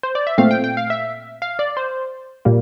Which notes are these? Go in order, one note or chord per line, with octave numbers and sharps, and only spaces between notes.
C5
D5
E5
A#2 A3 C4 F5
G5
G5
F5
E5
F5
D5
C5
A#2 G3 A#3